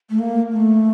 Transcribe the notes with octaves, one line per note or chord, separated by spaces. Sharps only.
A3
A#3
A3